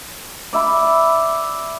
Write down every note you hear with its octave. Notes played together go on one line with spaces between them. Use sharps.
D5 E5 B5